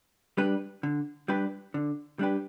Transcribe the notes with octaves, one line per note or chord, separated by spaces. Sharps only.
G3 D4 G4 B4
D3
G3 D4 G4 B4
D3
G3 D4 G4 B4